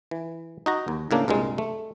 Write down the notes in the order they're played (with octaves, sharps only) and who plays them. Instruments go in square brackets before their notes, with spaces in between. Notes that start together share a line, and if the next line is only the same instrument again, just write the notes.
[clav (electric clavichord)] E3
D#4 F#4 A#5
D#2
A2 C#3 A#3 D4
C2 G2 A#2 G#3
A3